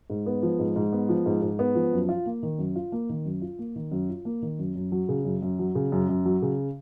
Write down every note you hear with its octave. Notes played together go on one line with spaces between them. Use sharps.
G#2
B3
F3
G#2
G#2
B3
F3
G#2
G#2
B3
F3
F#2
F4
A#3
D#3
F#2
F4
A#3
D#3
F#2
F4
A#3
D#3
F#2
F4
A#3
D#3
F#2
F#2
F#3
C#3
F#2
F#2
F#3
C#3
F#2
F#2
F#3
C#3